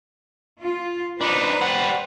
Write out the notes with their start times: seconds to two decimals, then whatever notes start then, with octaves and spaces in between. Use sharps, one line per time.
0.61 F4
1.21 D4 D#4 B4 C5
1.61 G3 F#5